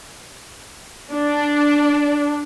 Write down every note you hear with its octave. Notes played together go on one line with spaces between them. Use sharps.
D4